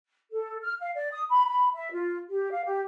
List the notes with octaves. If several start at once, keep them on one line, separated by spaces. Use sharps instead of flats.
A4
F6
F5
D5
D#6
B5
B5
E5
F4
G4
F5
G4